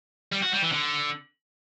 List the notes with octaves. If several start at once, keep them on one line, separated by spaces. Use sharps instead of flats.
G3
F#4
G3
E3
D3